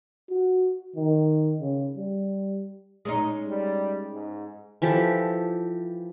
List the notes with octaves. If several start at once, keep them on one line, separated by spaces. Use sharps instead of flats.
F#4
D#3
C#3
G3
G#3 C#4 D#4
G3
G#2
E3 F3 G4 A4